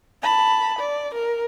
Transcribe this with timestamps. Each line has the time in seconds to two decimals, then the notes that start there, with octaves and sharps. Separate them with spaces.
0.22 A5 B5
0.79 D5
1.14 A#4